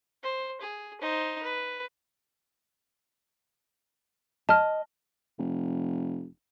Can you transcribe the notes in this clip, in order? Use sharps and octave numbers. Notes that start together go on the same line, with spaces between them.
C5
G#4
D#4 C5
B4
D#5 A5 F6
F1